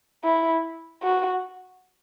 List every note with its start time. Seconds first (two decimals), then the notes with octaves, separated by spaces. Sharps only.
0.24 E4
1.03 F#4